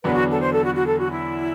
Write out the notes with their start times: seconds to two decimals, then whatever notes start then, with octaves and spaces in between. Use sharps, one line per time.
0.04 E2 D3 F#3 B3 D4 B4
0.13 F#4
0.30 A4
0.40 C5
0.52 A4
0.63 F#4
0.74 F#4
0.86 A4
0.99 F#4
1.10 E4